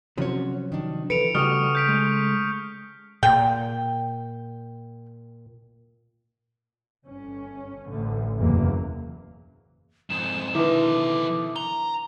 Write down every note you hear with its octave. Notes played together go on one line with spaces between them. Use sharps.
C3 F3 F#3 C#4 F#4 C#5
D#3 D4
E3 A4 B4 C#7 D7 F7
C#3 G3 A3 F#4 G4 C#6 D#6 F6
G6 B6 D7
G#3
A#2 G5
G1 C#4
A1 D2 D3
F#1 E2 C3 F#3 A#3
F2 G#2 E7
B2 D3 D#3 F3 E4 B4 E5 D6
A#5 G7